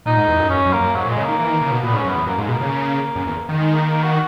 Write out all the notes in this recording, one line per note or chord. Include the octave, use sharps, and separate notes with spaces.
A#2 D#4
G#2
E2
F#2
F#2 C#4
F#2
A#3
F#2
G#2 F#3
A#2
G#3
C#3
D#3 A#3
E3
D#3
C#3
B2
A#2 B3
G#2 C#4
F#2
B3
E2
F#2 A#3
G#2 G#3
B2
A#3
C#3
F#2
E2
D#3
G#3
A#3
A#3
F#4